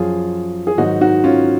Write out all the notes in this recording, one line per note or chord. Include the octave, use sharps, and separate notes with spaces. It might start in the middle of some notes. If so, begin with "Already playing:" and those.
Already playing: F#2 F3 F4 G#4
G#4
G#2 D#3 F#3 D#4 F#4
D#4 F#4
C#4 F4